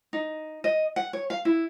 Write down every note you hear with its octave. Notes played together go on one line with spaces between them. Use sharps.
D#4
D#5
F#5
C#5
F5
E4